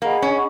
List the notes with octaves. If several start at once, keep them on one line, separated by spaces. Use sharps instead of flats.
A#3 G#4 D#5 F#5 B5
C#4